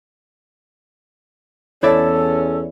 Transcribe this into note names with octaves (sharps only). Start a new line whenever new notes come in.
E2 C#4 E4 A4 C#5 D5 E5